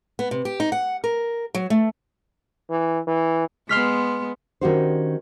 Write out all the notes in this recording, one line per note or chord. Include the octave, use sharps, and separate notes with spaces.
B3
C3
G4
D#4
F#5
A#4
F#3
A3
E3
E3
G#3 B3 C6 F6 B6
D#3 C#4 D4 F#4 G4 C5